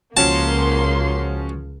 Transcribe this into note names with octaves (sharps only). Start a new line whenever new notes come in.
C#2 F3 A#3 C#4 F#4 A5 C6